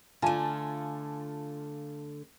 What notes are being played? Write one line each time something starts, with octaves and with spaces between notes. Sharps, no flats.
D3 A3 F4 G#5 A5